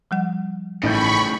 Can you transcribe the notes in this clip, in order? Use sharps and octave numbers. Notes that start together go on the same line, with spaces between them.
F3 G3 F#5
A1 A2 C#3 D#4 B5 C#6 G6